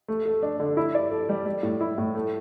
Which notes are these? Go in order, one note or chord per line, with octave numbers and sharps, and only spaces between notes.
A3
A4
D4
D3
E4
D5
A4
G3
G3
A2
E4
A2
A3